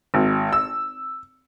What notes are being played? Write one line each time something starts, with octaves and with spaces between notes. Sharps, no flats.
G#1
E6